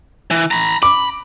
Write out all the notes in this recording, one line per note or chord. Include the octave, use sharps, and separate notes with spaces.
E3
A#5 B5
B5 D6